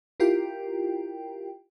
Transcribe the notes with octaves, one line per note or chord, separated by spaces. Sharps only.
E4 F4 G4 A#4 G5